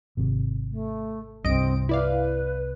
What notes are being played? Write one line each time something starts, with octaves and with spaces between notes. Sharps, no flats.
G#1 C3
A3
C2 G2 C4 D#5 D7
E4 B4 D5 F5